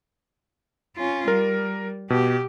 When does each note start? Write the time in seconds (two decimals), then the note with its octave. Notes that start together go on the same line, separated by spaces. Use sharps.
0.97 C#4 F4
1.28 G3 A#4
2.10 B2 G4